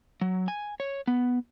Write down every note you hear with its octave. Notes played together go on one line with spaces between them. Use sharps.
F#3
G#5
C#5
B3